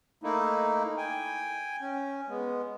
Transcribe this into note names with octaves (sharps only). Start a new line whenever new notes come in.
A3 A#3 D#4 E4
G5 G#5
C#4
G#3 B3